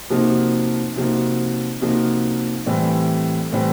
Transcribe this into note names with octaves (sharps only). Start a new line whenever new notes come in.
C3 F3 A#3 D#4 F#4
C3 F3 A#3 D#4 F#4
C3 F3 A#3 D#4 F#4
A2 E3 G3 C4
A2 E3 G3 C4